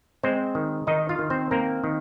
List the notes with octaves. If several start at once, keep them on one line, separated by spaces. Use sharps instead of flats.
G#3 C4 C5
D#3
D#3 D#4 D#5
F4 F5
D#3
C4 C5
A#3 C4 A#4
D#3